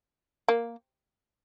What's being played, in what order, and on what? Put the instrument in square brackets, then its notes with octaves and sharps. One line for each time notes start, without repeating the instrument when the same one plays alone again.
[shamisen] A#3